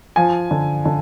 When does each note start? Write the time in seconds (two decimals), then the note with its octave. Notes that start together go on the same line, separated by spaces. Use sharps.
0.16 F3 G#5
0.51 D3
0.86 D3